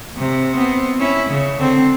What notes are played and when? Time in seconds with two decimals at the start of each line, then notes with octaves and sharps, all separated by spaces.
0.17 C3
0.54 B3 C4
0.98 C#4 E4
1.29 C#3
1.59 D3 C4